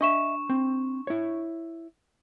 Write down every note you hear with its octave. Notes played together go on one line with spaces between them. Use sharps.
D4 D#5 E5 C#6 E7
C4
E4 C#5